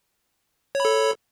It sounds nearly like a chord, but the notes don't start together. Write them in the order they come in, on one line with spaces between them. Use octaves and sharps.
C#5 B5 A4